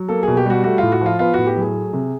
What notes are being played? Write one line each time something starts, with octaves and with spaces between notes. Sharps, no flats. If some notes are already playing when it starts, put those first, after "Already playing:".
Already playing: F#3
A#3 A4
B2 G#4
G4
G3 F#4
A3 F#4
A2 F4
F#4
F3 F4
B3 F4
A2 F#4
G4
F#3 G#4
A3
C3